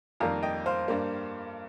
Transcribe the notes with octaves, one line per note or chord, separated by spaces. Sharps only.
F2 D#3 G3 A#3 F5 A#5
D#5 G5
C5 F5
G2 G3 A#3